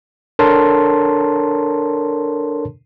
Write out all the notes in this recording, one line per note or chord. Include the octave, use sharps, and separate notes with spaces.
D4 A4 A#4 C#5 A5 C6